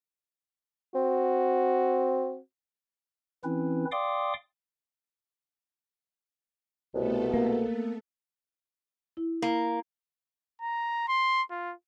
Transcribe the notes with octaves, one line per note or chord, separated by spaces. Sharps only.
C4 F#4
E3 C4 C#4 E4 B4
D5 F5 G5 C6 D6 D#6
C2 B2 A3 B3 A4
A#3
E4
A#3 E4
A#5
C6
F4